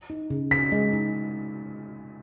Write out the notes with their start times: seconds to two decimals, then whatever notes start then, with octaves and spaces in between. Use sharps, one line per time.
0.10 D#4
0.30 C#3
0.51 C#3 B6
0.72 G#3
0.93 D#4